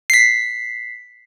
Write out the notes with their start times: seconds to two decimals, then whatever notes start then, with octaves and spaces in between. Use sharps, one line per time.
0.10 B6 C7